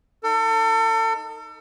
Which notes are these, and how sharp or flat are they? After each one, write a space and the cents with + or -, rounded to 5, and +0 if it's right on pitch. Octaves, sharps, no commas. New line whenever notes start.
D#4 +0 A4 +35